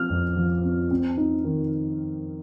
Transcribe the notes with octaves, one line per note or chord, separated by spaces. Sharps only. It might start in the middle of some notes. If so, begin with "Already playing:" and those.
Already playing: F3 C4 F4 F6
F2
F3
C4
C4
D#4
D#3